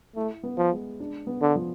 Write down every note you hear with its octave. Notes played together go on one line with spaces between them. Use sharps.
A3 E4
B3
F3
G#3
D4
B3
D3
F3